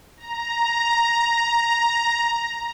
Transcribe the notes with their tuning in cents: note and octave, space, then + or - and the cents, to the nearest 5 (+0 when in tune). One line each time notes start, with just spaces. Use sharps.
A#5 +5